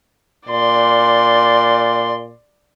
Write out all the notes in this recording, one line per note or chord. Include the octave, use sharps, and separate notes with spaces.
A#2 D5 C6